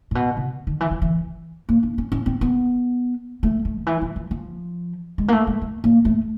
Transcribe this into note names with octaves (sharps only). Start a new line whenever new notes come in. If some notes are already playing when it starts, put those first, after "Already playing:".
A#2
B2
C3
D#3
E3
F3
E3
A#3
D4
C#4
C#4
C4
B3
A3
A3
D#3
E3
F3
F3
F3
G#3
A#3
A3
G#3
A3
A#3
A3